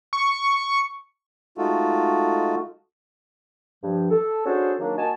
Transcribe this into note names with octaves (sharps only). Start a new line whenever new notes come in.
C#6
G#3 A3 D#4 F4 F#4 A4
G2 F3
A4
C#4 D4 F#4 G#4 A4 C5
D#3 F#3 A#3 D4
A#3 F#4 D#5 G#5 A5